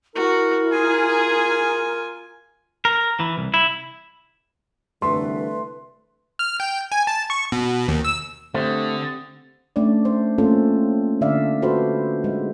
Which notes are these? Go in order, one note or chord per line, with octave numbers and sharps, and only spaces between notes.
E4 F#4 A#4
F4 G#4 G#5
A#4
E3
C2
E4
C2 D3 E3 A3 B4 C6
F6
G5
G#5
A5
C#6
B2
D#2
E6
D3 A3 C4 G4 C5 D#6
A3 C#4 D4 D5
C5
A3 A#3 C4 C#4 F4 A4
D3 D5 E5 F5
F4 F#4 A4 B4 C5
G#3